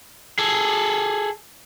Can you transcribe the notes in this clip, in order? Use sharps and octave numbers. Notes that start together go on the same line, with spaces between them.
G#4 A4